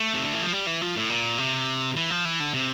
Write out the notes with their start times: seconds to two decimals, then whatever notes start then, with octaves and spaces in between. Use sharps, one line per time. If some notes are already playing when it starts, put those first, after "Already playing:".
Already playing: A3
0.14 C3
0.24 D3
0.33 E3
0.42 F3
0.53 G3
0.67 E3
0.81 F3
0.96 A2
1.10 A#2
1.38 C3
1.96 E3
2.11 F3
2.25 E3
2.40 D3
2.54 C3